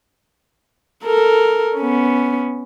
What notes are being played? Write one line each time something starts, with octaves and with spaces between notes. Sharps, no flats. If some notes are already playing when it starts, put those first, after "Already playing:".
A4 A#4
B3 C#4